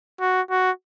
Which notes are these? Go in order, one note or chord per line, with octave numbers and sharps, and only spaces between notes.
F#4
F#4